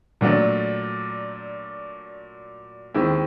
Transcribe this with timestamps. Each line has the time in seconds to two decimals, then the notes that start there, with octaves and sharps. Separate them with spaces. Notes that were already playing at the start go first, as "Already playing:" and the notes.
0.21 A#2 F#3 A3 D4
2.94 D#2 D#3 G#3 C4 E4